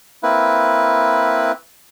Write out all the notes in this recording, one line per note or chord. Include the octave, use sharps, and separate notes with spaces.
A#3 C4 E4 B4